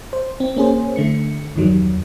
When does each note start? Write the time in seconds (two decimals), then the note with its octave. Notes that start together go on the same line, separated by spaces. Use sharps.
0.13 C5
0.40 C4
0.56 A#3 C#4 G#4 C5
0.96 D3 A3 C#7
1.56 E2 G2 D#3 F#3 G3